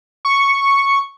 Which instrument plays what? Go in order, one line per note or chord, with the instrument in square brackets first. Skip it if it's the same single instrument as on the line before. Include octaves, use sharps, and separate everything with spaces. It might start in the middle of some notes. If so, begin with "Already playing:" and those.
[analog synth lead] C#6